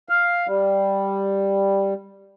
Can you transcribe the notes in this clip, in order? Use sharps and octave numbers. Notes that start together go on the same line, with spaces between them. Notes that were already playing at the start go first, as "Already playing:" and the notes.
F5
G3